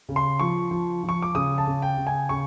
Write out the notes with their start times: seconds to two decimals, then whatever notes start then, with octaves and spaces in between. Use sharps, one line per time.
0.09 C#3
0.16 C6
0.40 F3 C#6
0.71 F3
1.04 F3
1.09 C#6
1.22 D6
1.35 C#3 D#6
1.58 A5
1.67 C#3
1.82 G5
1.98 C#3
2.07 G#5
2.29 C#3 C#6